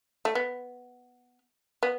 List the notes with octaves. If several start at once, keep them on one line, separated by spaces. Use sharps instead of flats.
A3
B3
B3